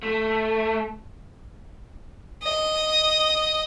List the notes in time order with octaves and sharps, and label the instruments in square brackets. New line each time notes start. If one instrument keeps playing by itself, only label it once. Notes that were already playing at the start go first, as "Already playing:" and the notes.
[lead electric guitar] A3
[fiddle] D#5